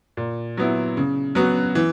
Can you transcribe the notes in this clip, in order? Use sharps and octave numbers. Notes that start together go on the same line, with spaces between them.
A#2
F#3 B3 E4
C#3
F#3 B3 F#4
E3